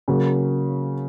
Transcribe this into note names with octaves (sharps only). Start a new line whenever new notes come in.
C#3 F#3 A#3